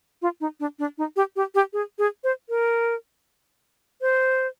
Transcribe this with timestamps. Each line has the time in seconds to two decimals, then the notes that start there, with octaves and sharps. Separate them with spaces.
0.22 F4
0.41 D#4
0.60 D4
0.79 D4
0.98 D#4
1.16 G4
1.36 G4
1.55 G4
1.73 G#4
1.98 G#4
2.24 C5
2.49 A#4
4.01 C5